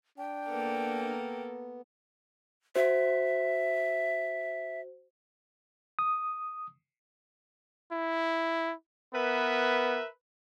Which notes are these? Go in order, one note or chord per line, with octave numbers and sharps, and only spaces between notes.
D4 G5
A#3 B3 A4 A#4
F#4 C5 E5
D#6
E4
B3 A#4 B4 E5